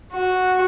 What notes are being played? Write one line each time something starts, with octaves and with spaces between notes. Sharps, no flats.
F#4